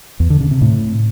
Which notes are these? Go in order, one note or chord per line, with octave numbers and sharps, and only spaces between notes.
E2
D3
C#3
C3
A2